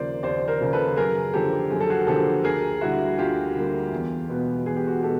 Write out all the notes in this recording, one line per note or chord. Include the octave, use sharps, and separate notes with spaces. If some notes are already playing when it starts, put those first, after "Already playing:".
Already playing: D#2 C#3 F3 A#3 C5 D5
D#2 C5 D5
A#4 C5
C#3 F3 A#3
A4 B4
F#2 G#4 A#4
D3 F3 A#3 G4 A4
F#2 G#4
A4
F#4 G#4
D3 F3 A#3 G4 A4
D2 G#4 A#4
D3 G3 A#3 E4 F#4
D2 F4 G4
D3 G3 A#3
E2
B2 G#3 B3
E2 G#4
G4
F#4 G#4
B2 G#3 B3 G4 A4